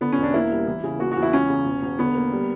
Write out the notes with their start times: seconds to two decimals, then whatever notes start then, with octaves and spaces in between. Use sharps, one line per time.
0.01 D3 B3
0.12 C#4
0.18 E1 D4
0.34 A#3 E4
0.51 G3
0.67 E3
0.84 C#3
0.99 A#3 F#4
1.11 F#4
1.17 E2
1.22 E4
1.33 C#2 C#4
1.50 C#3
1.65 E1
1.82 E1
1.99 D3 B3
2.15 A#3
2.32 G3